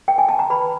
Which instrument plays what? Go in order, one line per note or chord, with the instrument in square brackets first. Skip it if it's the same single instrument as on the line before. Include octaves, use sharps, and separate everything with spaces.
[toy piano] G5
G#5
A5
A#5
B4 B5